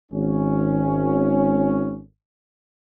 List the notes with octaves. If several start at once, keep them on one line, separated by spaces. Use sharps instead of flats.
G#1 C#4